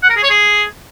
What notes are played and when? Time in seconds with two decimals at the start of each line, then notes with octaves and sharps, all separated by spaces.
0.03 F#5
0.10 A#4
0.16 G#4
0.23 C#5
0.30 G#4